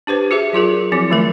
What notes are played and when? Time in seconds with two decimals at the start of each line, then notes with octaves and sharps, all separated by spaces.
0.07 D4 G4 B4 C5
0.31 F#4 G#4 C5 E5
0.53 F#3 F4 G#4 A#4
0.92 F3 F#3 C4 E4 F#4
1.10 D#3 A3 A#4